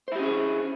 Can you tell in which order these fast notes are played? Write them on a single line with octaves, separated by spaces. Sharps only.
C5 E4 G4 C#4 G#4